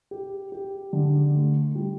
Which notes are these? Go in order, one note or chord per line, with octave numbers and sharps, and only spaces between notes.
G4
G4
D3
A3
G3